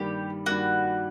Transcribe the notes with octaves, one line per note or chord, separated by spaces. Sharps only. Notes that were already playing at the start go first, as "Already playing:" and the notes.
Already playing: G2 D#3 G3 A#3 G4
G2 D#3 G3 A#3 F#4